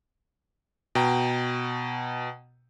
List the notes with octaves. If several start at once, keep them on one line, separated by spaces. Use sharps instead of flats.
B2 G5 A#5